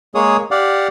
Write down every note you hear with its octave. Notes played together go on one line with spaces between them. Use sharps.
G#3 A#3 G#4 C#5 D#6
G4 D5 F5 F#5